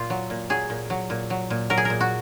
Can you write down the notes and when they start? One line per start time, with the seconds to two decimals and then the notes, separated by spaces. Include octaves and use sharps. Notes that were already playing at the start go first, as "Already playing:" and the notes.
Already playing: A#2 F4
0.10 F#3
0.30 A#2
0.50 F#3 G#4
0.70 A#2
0.90 F#3
1.10 A#2
1.30 F#3
1.50 A#2
1.70 F#3 A#4
1.77 G#4
1.85 A#2 A#4
2.00 F#4